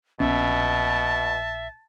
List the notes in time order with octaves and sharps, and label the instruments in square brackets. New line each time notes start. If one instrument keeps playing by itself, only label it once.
[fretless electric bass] A#1 B3 C#4 [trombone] B2 [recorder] E5 [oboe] A5